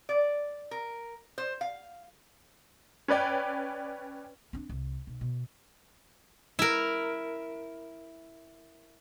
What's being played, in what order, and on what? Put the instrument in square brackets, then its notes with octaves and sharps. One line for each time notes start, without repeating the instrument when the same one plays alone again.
[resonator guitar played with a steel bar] D5
A#4
C5
F5
[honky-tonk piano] C#4 B4 D5 G5
[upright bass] C4 D4
C2
B1
B2
[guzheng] E4 A#4